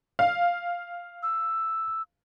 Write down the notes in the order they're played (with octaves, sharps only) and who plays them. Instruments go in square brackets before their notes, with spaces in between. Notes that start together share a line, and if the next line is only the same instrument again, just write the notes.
[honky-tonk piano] F5
[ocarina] E6